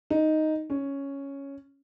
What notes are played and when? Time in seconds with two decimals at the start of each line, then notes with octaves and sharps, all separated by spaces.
0.10 D#4
0.70 C#4